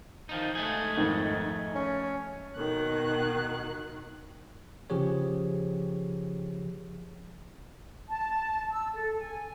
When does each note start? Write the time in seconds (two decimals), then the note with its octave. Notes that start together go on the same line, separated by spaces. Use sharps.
0.29 D#3 F3 D#4
0.55 G#3 A3 G#4
0.97 F2 G#2 D#3
1.75 C#4
2.55 B2 D#3 F#6
4.90 C#3 F3 G4 G#4 C#5
8.09 A5
8.71 E6
8.95 A4
9.19 G#5